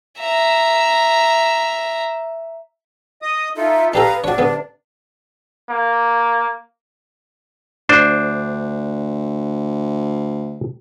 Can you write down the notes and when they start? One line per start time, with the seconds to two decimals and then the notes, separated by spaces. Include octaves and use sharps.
0.20 E5 A#5
3.22 D#5 D#6
3.57 D#4 F4 A4 E5
3.94 D4 G4 A4 B4 F5 A#5
4.24 C3 D4 F#4 C#5 D5
4.38 D3 B3
5.70 A#3
7.89 D2 D4 C5